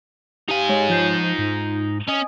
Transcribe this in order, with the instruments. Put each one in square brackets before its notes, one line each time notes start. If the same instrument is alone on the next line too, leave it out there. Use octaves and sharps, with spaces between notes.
[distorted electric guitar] D#4 G#5 [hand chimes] G4 F5
[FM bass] G#3 [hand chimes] C#5
[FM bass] F3 [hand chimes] F4 G6 C7
[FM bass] G#2
[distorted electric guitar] C#4 [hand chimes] D#5 G#5 D#6